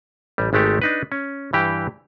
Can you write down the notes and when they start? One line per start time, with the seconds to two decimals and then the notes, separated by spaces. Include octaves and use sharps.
0.38 A1 G3
0.53 G#1 G#3 A3 G4 A4
0.82 D4 D#4 B4
1.12 C#4
1.53 G2 E3 G4 G5